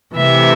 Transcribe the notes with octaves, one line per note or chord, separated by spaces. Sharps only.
C3 E3 A3 E5